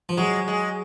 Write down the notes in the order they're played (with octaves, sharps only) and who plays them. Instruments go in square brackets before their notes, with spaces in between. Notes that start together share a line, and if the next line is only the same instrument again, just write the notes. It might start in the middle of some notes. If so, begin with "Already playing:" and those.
[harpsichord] F3
[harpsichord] F#3 [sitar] G#3
[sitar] G#3